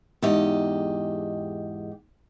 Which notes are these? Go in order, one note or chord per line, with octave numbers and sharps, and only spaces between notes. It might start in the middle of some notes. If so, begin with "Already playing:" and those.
E2 G#2 G4 D#5